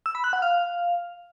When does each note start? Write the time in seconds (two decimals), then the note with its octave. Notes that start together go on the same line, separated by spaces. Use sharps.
0.06 E6
0.15 B5
0.24 F#6
0.33 F#5
0.42 F5